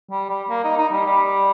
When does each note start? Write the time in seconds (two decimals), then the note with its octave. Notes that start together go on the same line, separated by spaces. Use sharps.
0.11 G3
0.29 G3
0.49 A#3
0.64 D#4
0.77 D#4
0.92 G3
1.06 G3